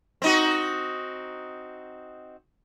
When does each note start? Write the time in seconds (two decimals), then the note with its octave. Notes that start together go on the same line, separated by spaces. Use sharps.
0.22 C4 D#4 F#4